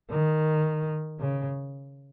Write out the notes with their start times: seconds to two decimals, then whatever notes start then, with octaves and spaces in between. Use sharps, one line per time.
0.10 D#3
1.19 C#3